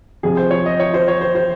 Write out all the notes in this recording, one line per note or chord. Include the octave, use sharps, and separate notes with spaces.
F2 C3 F3 G#4
C5
C#5
D#5
C#5
C5
C#5
C5
C5